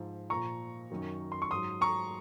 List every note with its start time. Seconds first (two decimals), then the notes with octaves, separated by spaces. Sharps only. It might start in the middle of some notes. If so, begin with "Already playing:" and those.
Already playing: G#2 F3
0.30 A#2 F3 A#5 C#6
0.91 F#2 D#3 F#3
1.32 C6
1.42 C#6
1.51 G#2 F#3 C6 D#6
1.81 A#5 C#6